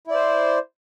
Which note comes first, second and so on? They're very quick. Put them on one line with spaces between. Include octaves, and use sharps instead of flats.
E4 D5 C5